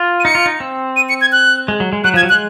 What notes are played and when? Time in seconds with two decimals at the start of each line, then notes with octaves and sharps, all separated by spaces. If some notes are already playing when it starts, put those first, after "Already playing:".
Already playing: F4
0.20 D#7
0.25 D#4 C#7
0.35 F4
0.46 D#4
0.60 C4
0.96 D#7
1.09 C#7
1.21 G#6
1.32 F#6
1.68 G#3
1.80 F#3
1.93 G#3
2.04 F#3 F#6
2.14 F3 G#6
2.23 F#3
2.29 G#3 F#6